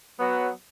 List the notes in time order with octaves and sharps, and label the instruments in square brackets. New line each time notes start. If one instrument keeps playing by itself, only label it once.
[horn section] F#3 B3 F#4